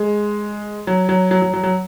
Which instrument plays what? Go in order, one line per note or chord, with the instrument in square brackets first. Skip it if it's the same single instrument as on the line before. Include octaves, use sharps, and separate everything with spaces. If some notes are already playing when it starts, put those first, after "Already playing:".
Already playing: [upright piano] G#3
F#3
F#3
F#3
F#3
F#3
F#3